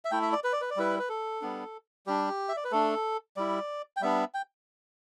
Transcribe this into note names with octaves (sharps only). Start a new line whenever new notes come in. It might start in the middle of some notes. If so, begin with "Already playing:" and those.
E5
A3 E4 G5
E5
D5
B4
D5
B4
D5
G3 E4 B4
B4
A4
G3 B3 D4
G3 D4 G4
E5
D5
B4
A3 D4 A4
G3 E4 D5
G5
G3 B3 D4 E5
G5